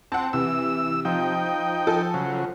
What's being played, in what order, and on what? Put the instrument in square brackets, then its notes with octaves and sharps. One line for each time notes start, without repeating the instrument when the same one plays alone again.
[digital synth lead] C4 [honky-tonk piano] F#5 A5
[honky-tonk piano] C3 [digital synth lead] E3 [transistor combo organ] E6
[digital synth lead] F3 [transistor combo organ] D#4 G5
[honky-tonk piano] A4 G#5
[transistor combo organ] C#3 F#3